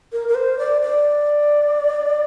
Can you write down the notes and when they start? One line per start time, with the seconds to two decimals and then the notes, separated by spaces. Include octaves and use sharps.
0.12 A#4
0.28 A#4
0.35 C5
0.59 D5
0.81 D5